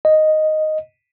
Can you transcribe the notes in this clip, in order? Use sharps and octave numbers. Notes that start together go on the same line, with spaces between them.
D#5